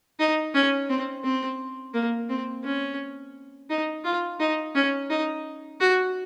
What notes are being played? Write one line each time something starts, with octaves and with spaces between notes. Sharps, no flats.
D#4
C#4
C4
C4
A#3
C4
C#4
D#4
F4
D#4
C#4
D#4
F#4